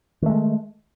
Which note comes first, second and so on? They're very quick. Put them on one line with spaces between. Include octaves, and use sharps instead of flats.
D#3 A3 G#3